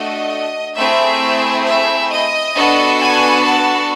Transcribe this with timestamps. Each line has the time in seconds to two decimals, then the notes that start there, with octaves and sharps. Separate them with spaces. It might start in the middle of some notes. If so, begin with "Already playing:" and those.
Already playing: A3 D4 F#4 A4 D#5
0.76 A3 C4 E4 G#4 E5
1.65 E5
2.10 D#5
2.55 B3 D4 F#4 A4
3.00 G#5
3.44 A5